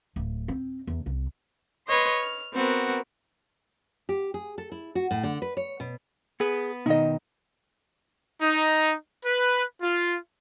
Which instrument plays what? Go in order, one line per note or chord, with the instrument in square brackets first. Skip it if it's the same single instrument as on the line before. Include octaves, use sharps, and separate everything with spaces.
[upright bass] D1
C4
E2
C2
[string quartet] B4 C#5 D#5 C6
F6
B3 C4 F#4 A#4
[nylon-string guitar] G4
G#4
A4
E4
F#4
A2
D3
B4
C#5
B2
[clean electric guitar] B3 B4 [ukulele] G#4
[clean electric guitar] B2 D#3 [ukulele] D#4 D#5
[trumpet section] D#4
B4
F4